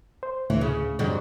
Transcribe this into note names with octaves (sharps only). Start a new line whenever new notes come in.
C5
D2 A2 E3
C#3
F2 G#2 D3 F#3 G3